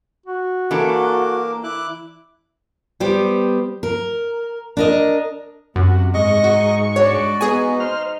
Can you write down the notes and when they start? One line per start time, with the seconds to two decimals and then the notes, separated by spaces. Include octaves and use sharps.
0.26 F#4
0.71 E3 A#3 D4 A4 D6
1.64 E4 D6 F#6
3.00 G3 B3 G4 C5
3.83 A#4
4.77 D4 A#4 D#5
5.76 F#2 C3 F#4
6.14 G#2 D#5 C#6
6.44 G#3 D#4 F#4
6.96 G#3 D4 F#4 C#5
7.41 B3 D#4 G#4 G#5
7.80 C5 F6